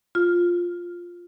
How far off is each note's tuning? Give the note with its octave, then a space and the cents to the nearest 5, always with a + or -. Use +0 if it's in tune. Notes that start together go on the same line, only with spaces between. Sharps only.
F4 +5